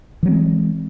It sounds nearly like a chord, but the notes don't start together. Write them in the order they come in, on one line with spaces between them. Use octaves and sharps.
E3 F#3 C4 G#3